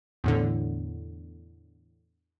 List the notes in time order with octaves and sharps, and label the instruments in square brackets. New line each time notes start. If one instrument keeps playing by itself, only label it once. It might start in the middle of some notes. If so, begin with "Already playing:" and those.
[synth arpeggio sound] E2 A2 D3